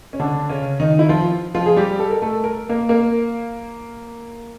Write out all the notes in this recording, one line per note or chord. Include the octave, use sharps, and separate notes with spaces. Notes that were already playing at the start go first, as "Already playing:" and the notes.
C#4
D3 D4
C#3 C#4
D#3 D#4
E4
F3 F4
F3 F4
G#4
G3 G4
A4
A#4
A3 A4
A#4
A#3 A#4
A#3 A#4